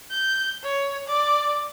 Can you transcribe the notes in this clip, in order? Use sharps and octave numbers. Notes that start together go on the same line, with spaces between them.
G6
C#5
D5